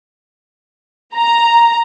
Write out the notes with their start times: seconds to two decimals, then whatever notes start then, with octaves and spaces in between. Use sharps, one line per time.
1.15 A#5